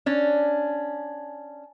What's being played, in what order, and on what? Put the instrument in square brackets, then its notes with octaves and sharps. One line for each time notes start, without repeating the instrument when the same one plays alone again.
[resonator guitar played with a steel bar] C#4 D4